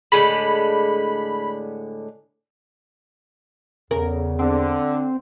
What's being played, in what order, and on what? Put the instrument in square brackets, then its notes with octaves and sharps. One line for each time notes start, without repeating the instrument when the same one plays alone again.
[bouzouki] A2 D3 G#3 [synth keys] B5
[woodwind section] E2 [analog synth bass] C#3 [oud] A#4
[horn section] D3 [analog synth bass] C4